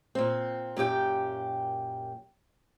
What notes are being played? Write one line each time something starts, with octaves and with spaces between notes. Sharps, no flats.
A#2 C4
F#2 A#2 G4 G5